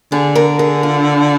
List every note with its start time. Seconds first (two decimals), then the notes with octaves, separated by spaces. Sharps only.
0.12 D3 G#4
0.35 A#4
0.59 G#4
0.83 F4